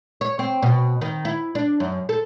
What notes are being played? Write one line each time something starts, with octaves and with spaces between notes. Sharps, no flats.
C#5
C4
B2
D#3
E4
D4
F#2
A4